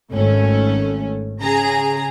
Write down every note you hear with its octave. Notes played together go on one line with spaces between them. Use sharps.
G#1 A3 C#4
C#3 G#4 A#5